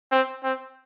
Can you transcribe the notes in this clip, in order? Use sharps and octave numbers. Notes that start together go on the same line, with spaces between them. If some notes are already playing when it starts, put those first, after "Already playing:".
C4
C4